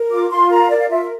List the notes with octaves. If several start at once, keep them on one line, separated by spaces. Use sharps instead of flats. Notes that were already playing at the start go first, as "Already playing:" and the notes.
Already playing: A#4
F4 D6
F4 C6
A#4 A#5
A#4 D5
F5
F4 E5